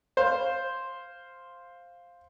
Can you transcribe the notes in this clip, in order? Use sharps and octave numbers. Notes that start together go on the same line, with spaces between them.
C5 F5